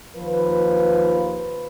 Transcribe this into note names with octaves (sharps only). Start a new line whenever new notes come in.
D#2 F3 B4